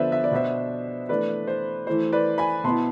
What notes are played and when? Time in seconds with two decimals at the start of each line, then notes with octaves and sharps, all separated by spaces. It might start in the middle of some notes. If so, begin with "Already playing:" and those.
Already playing: D3 F3 B3 D4 B4 C5 D5 E5
0.12 E5
0.24 D5
0.31 B2 B3 D4 C5 E5
1.09 E3 A3 D4 B4 D5
1.47 C5
1.87 E3 A3 E4 C5
2.12 B4 D5
2.38 G#5 B5
2.64 B2 B3 E4 A5 C6